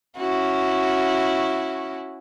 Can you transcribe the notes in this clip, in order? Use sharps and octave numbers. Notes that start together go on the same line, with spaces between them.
C#4 E4 F#4